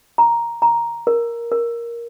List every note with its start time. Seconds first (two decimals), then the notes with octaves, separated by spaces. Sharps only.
0.18 A#5
0.62 A#5
1.07 A#4
1.52 A#4